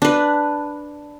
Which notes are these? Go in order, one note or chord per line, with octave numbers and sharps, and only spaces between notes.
D4 B4